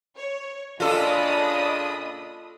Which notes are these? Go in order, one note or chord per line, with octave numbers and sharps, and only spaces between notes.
C#5
A#2 C#3 D4 F4 A4 D#5 B5 D#6